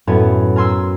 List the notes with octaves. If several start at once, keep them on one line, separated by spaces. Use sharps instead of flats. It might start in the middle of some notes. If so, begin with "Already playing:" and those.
F#2 A2 B3 G#5
A#4 G#5 C6 E6